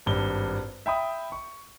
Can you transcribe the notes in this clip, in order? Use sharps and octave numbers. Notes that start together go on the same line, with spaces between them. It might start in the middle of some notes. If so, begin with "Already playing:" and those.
G#1 G2 G7
E5 G5 B5 D#6
C#6